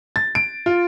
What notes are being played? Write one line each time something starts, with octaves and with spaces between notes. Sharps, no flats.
A6
D7
F4